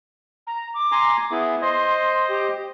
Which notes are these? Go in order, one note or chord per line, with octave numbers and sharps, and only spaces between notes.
A#5
D6
G#5 A#5 C6
B3 E4 G#4
C5 D#5 C6
G4